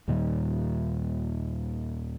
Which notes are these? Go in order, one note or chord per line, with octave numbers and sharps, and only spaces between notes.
D#2 A#2 D#3 G3